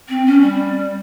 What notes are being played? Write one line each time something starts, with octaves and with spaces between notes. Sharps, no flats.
C4
C#4
G3